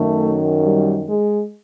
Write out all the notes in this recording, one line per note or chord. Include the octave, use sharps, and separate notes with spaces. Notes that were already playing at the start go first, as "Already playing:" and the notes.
Already playing: F#2 D#3 A3
G3
G#3